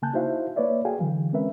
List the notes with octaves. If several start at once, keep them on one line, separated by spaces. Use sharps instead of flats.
C#3 A#3 G#5 A5 F#6 G6
D#4 E4 F#4 C5 E5 F5
A#3 B4 C#5 D5 E5
F#4 G#4 A4 F5 G5 G#5
D3 E3 F#3
G#3 C4 C#4 A#4 B4 E5